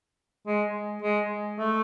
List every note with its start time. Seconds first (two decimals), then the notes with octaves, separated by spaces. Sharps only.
0.46 G#3
1.02 G#3
1.59 A3